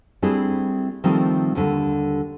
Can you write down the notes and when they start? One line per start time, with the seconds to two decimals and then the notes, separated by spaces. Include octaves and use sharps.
0.22 G3 A3 C4 D4 E4 G#4
1.04 D#3 F3 G3 A3 C4 D#4
1.55 D#2 D3 G3